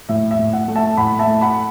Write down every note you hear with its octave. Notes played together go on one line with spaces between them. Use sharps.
A2 E5
E5
A2
F#5
A3
E5 A5
A2 F#5 B5
E5 A5
A3
F#5 B5